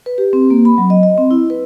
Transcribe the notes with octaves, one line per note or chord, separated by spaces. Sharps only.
B4
G4
C4
A#3
B5
F#3
D#5
D#5
C4
E4
B4